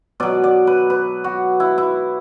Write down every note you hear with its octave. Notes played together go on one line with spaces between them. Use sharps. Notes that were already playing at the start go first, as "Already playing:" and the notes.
B2 F#3 D5
D5
B4
B4
F#4
E4
E4